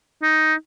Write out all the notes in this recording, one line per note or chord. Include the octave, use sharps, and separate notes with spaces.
D#4